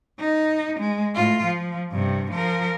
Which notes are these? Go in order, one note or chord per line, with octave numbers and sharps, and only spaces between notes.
D#4
G#3
A2 F4
F3
G2 C3
F3 A#4